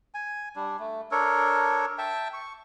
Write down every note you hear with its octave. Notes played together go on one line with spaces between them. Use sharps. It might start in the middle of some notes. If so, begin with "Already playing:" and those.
G#5
G3 D4
A3
D4 A4 A#4 C#5
E5 G5 A5
C#6